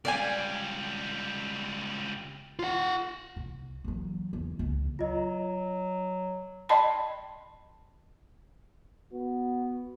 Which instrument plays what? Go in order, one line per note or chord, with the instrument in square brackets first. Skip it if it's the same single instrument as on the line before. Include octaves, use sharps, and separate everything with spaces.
[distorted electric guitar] C#2 G3 [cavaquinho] D5 F5 G#5
[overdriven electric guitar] F4 F#5
[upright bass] C2
E3 F#3
E2
C#2
[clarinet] F#3 [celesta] F4 D#5
[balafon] D5 D#5 G5 A5 B5 C6
[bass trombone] B3 [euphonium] F#4